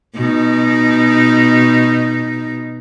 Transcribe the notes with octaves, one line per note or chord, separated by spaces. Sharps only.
B2 D#4